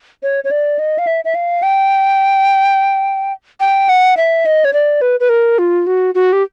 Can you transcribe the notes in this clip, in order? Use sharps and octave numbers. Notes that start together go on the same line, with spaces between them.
C#5
C#5
D5
D#5
F5
E5
E5
F5
G5
G5
F#5
E5
D#5
C#5
D5
B4
B4
A#4
F4
F#4
F#4
G4